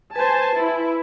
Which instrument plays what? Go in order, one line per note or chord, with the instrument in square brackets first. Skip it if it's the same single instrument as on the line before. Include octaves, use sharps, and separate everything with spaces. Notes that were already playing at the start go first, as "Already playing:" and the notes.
[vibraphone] B4 [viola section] C5 G#5 A5
[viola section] E4